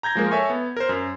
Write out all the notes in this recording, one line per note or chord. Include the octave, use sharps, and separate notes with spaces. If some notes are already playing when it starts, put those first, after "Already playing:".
A#5 G6 G#6 A#6
F3 G#3 A#3 A#4
A4 C#5 E5 G#5 C#6
B3
A#4 C5
F#2